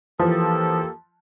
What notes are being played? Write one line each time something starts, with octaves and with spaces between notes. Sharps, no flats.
E3 F3 A#3 G4 A4